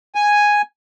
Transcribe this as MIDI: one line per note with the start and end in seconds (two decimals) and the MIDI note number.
0.15 0.62 80